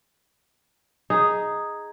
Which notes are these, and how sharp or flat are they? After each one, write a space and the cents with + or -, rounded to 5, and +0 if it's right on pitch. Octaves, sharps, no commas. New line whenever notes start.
D#4 +0 G#4 +0